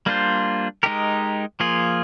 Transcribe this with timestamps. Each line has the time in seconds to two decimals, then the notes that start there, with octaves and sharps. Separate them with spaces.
0.06 G3 A#3 D4 F4 C5
0.83 G#3 D#4 G4 A#4
1.60 F3 A#3 F4 G#4